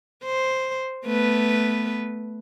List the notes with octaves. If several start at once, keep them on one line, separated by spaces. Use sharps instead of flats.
C5
A3 B3 B4